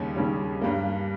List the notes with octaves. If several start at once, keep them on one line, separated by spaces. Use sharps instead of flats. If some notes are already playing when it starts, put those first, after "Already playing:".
Already playing: D#2 C#3 G3 C#4
D#2 C#3 G3 C#4
G2 G3 A#3